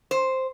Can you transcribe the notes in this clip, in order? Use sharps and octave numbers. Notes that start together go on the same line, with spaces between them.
C5